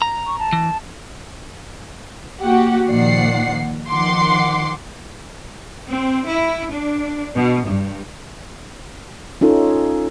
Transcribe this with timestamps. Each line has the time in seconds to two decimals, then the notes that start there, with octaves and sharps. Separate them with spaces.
0.02 A#5
0.27 C#6
0.39 A5
0.53 E3
2.41 A#3 F#4 G4 F#5
2.90 A#2 D#3 F3 D5 F#5 C7
3.90 D#3 F3 F#5 C6 D6 C7
5.89 C4
6.29 E4
6.73 D4
7.35 B2
7.67 G2
9.41 C#4 D#4 F4 A4